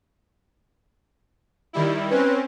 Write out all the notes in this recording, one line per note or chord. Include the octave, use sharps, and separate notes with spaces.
D#3 G3 E4
C4 C#4 B4